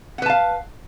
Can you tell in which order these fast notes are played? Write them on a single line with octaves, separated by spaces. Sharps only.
F#5 B4 A5 F5